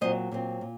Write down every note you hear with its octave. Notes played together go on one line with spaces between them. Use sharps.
A#2 F#3 C4 C5 D#5
A#2 F#3 C4
A#2